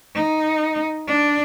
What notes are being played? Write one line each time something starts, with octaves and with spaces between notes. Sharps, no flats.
D#4
D4